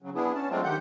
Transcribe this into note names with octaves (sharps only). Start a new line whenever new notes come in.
C#3 F#3
B3 D4 E4 G#4
C#4 A5
F#3 G#3 A3 C4 D4 F4
D#3 G4 F#5 G6